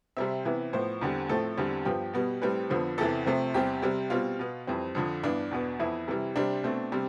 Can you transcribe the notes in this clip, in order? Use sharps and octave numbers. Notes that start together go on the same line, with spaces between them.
C3 G3 C4 E5
C3 E3 B3
A2 F3 B3 C5
E2 D3 G3 C4
A2 F3 A3 C4 A4
E2 D3 G3 C4
G2 F3 B3 G4
B2 G3 B3
A2 G3 C4 B4
F2 D3 F3 B3
E2 C3 E3 A4
C3 F3 A3 C4
E2 C3 G3 C4 G4
C3 G3 C4
B2 G3 C4 F4
B2 B3
F2 E3 G3 C4
F2 D3 F3
G2 E3 B3 D4
E2 B2 B3
F2 E3 B3 E4
C3 E3 G3
C3 G3 C4 D4
B2 A3 C4
C3 G3 C4